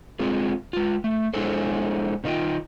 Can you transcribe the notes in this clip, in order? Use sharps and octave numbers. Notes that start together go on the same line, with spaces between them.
G#3 C4 F4 G#4
G#3 F4
A3
G#3 D4 E4 G#4 A4 C5
B2 D#3 D#4 F4 G5